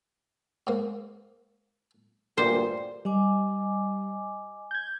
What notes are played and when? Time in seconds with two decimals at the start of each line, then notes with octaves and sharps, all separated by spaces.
0.67 G#2 A#3
2.38 D2 G2 A#2 A#4 C5 D5
3.05 G3 D#5 G#5 D6
4.71 G6 G#6